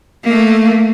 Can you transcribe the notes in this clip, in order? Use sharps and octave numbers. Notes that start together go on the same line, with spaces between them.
A3 A#3